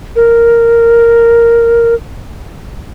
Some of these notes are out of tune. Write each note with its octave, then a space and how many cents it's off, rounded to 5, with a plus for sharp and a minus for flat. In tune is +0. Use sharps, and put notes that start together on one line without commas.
A#4 -5